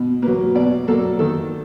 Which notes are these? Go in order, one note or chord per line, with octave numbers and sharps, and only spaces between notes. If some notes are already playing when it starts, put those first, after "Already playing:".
Already playing: B2
F#3 A#3 B4
B2 D5
F#3 A#3 A4
D#3 A4